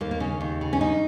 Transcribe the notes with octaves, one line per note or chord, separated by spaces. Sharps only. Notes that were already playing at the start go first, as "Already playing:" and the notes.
D#2 A#3
A#3
C#3 C#4
D#2
C#3
C#4
C#3 D#4